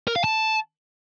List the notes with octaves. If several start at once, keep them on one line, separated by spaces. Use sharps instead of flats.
A#4
F5
A5